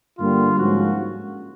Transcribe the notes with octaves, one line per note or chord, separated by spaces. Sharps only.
G2 D3 G3 A#3 F4
G#2 F3 A#3 C#4 F#4